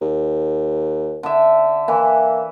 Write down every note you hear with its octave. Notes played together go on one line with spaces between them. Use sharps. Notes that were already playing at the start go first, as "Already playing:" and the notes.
D#2
D3 E5
E3 A#3